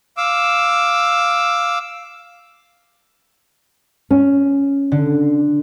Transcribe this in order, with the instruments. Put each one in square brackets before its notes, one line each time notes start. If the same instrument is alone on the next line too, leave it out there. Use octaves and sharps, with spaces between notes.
[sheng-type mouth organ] F5 D6 E6
[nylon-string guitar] C#4
[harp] D3